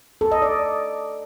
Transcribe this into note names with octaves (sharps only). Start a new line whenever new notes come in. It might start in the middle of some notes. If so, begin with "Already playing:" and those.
A4
D#5
D5